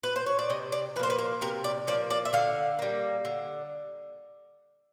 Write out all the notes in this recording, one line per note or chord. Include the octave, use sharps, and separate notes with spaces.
B4
C5
C#5
D5
C3 D#5
D5
F3 A#3 B4 C5
B4
A#4
C3 A#4
D5
F3 A#3 D5
D5
E5
D3 F5
G3 A#3
D3